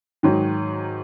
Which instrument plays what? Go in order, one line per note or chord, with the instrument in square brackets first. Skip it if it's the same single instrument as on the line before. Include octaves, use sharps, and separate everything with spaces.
[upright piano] G#2 D#3 F#3